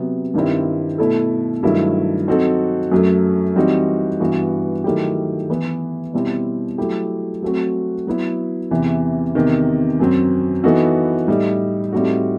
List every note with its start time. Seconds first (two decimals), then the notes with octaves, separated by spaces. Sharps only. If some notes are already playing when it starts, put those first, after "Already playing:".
Already playing: C3 F#3 B3
0.34 G2 D#3 G3 C4 E4
0.98 B2 A3 E4 A4
1.63 G2 D#3 F#3 A3 E4
2.27 F#3 C4 D#4 F#4 A4
2.92 F#2 F#3 A3
3.56 E3 G3 C4 D#4 F#4
4.20 G2 E3 B3 F#4
4.84 D#3 F#3 A3 E4 G4
5.50 E3 B3 E4
6.13 B2 G3 C4 E4
6.78 F#3 A3 E4 G4
7.42 F#3 A3 C4 F#4
8.07 F#3 B3 E4
8.71 E2 C3 E3
9.35 E2 C3 D#3
10.00 F#2 F#3 C4
10.63 E3 B3 D#4 F#4 A4
11.28 A2 G3 D#4
11.92 A2 G3 C4 D#4 F#4